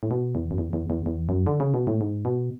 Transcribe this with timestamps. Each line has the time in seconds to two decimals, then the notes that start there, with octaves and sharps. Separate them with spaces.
0.03 A2
0.11 B2
0.35 E2
0.51 F#2
0.58 E2
0.73 E2
0.90 E2
1.06 E2
1.29 F#2
1.47 D3
1.60 C#3
1.74 B2
1.87 A2
2.01 G#2
2.25 B2